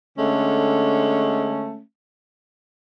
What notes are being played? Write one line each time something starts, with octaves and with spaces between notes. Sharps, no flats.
D3 G#3 A3 C#4